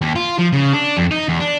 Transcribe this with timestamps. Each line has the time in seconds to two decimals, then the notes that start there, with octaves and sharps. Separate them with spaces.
0.02 D#2
0.16 F4
0.38 F3
0.53 C#3
0.73 D4
0.97 F2
1.11 D#4
1.29 E2
1.40 D4